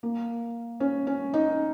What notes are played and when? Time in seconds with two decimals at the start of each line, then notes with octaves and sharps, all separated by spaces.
0.03 A#3
0.80 C#4
1.07 C#4
1.34 D#4